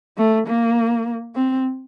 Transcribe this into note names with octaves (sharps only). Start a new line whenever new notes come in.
A3
A#3
C4